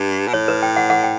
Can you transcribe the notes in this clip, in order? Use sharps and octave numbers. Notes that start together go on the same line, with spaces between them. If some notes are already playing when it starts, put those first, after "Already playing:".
Already playing: G2
B2
A2 C#5
B4
G5
F#5
F#5
G5